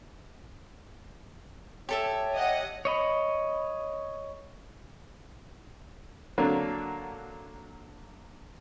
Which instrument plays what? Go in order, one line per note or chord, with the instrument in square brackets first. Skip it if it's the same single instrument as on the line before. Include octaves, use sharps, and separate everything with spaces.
[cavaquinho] G4 A4 E5 [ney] C#5
[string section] D#5 F#5
[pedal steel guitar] C#5 D#5 B5
[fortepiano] D3 F#3 A#3 D4